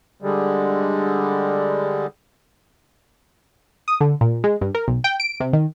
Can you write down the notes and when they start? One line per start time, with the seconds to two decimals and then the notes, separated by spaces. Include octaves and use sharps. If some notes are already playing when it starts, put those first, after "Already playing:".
0.22 D3 G3 G#3
3.88 D#6
4.01 D3
4.21 A#2
4.44 G#3
4.61 G2
4.75 A#4
4.88 B1
5.04 G5
5.20 D7
5.40 C3
5.53 D#3